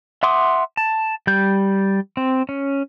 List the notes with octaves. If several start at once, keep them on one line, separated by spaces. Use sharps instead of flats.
E5 F#5 C6 D6 D#6
A5
G3 G6
C4
C#4